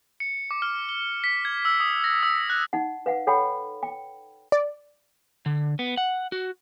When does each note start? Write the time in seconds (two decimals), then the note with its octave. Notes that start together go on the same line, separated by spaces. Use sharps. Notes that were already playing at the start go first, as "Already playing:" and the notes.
0.20 C#7
0.51 D6
0.62 F6
0.89 G7
1.24 B6
1.45 G#6
1.65 E6
1.80 D#6
2.04 A#6
2.23 E6
2.50 F#6
2.73 D#4 F#5
3.06 B4 F5 F#5
3.27 A4 C#5 F#5 G5 B5
3.83 G5
4.52 D5
5.46 D3
5.79 B3
5.97 F#5
6.32 F#4